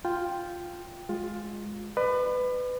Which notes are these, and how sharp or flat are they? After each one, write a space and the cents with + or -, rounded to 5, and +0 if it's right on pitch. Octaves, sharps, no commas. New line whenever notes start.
F4 +0 G5 +0
G#3 +0 F4 +15
B4 +20 D5 +45